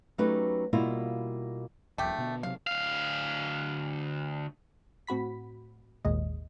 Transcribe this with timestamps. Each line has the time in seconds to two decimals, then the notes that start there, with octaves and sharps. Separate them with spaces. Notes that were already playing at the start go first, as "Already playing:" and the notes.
0.18 F#3 A3 C#4 D#4 G4 B4
0.73 B2 G3 A#3 E4 F4
1.98 E1 B1 A3 G4
2.18 B2 D3 B3
2.43 C3 F#3 F5
2.67 D2 F5
5.07 A2 C4 F#4 B5 B6
6.05 G#1 D#2 A#2 G#3 D#5